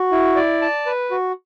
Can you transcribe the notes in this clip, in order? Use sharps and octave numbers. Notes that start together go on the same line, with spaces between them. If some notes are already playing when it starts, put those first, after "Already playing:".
Already playing: F#4
E4
D5
A5
B4
F#4